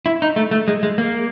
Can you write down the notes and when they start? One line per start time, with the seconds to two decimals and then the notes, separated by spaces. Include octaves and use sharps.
0.06 E4
0.22 D#4
0.36 A3
0.51 A3
0.68 G#3
0.83 G#3
0.98 A#3